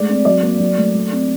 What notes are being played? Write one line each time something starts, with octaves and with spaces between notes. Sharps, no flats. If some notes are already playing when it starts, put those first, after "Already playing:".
Already playing: G#3 A3 D5
C4
F#3 D5
A#3
F#3
A3
A3
C4